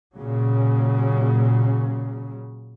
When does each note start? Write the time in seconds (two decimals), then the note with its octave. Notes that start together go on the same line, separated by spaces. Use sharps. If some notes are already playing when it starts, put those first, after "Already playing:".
0.15 A#2 C#3 F#3